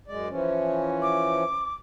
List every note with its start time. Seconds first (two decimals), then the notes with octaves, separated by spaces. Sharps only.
0.07 F#2 G#3 D5
0.30 E3 F3 C#4
1.02 D6